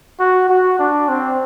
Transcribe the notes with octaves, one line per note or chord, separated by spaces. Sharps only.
F#4
F#4
D4
C4